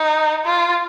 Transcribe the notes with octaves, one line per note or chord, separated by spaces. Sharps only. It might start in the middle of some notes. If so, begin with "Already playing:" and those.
Already playing: D#4
F4